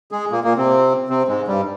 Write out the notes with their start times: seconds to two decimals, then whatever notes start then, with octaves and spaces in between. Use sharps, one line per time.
0.11 G#3 G#4
0.31 A#2 A#3
0.44 A#2 A#3
0.57 C3 C4
1.08 C3 C4
1.28 G#2 G#3
1.48 G2 G3